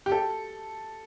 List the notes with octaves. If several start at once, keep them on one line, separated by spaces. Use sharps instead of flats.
G4
A4